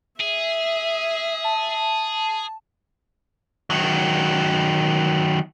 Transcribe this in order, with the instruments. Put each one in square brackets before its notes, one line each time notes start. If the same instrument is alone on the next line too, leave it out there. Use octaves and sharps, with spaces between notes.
[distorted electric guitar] G#4 [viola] E5
[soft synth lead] A5
[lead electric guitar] D#3 F#3